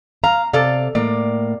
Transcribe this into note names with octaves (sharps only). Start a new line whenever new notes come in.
F5 A#5
C3 A4 D5 F5
A2 A#3 D5